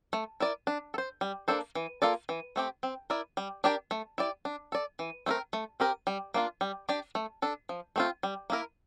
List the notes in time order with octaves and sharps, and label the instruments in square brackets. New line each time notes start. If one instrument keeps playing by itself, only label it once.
[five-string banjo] A3
E4 A#4 D5
D4
A4
C5
G3
A#3 D4 A4 C5
E3
A#3 F4 A4 D5
E3
A3 C4 G4
C4
E4 A#4 D5
G3
D4 G4 A#4 D5
A3
E4 G4 D5
D4
A4 D5
E3
A3 C4 E4 A#4
A3
C4 G4 A#4
G3
A#3 D4 F4
G3
D4 G4 D5
A3
D4 A4
F3
A3 C4 F4
G3
A#3 E4 A#4